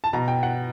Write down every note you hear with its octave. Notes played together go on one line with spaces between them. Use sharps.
A5
B2 A#5
G5
F#5